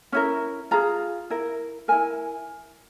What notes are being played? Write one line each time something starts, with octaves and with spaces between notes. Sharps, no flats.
C#4 E4 A#4
F4 G#4 A#5
E4 A#4
E4 A#4 G#5